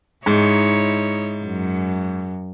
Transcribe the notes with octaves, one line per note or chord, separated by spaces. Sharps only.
G#2 D#4 E4 C#5
F#2